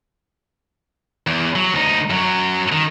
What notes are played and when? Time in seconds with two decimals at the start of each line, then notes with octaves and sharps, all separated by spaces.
1.27 E2
1.56 F#3
1.74 D2 D#4
2.10 F#2 F#3
2.72 D#3